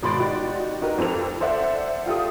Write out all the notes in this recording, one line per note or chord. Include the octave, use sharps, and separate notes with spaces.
G#1 B2 B5 C6 A6 D7
D#4 F#4 G4 D5
D#4 F#4 G4 A#4 B4
F2 C4 A4 F7
A4 C5 D5 E5 F#5
F4 G4 A4 D#6